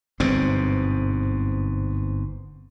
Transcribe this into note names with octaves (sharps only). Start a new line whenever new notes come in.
G1 G#2 B2 C4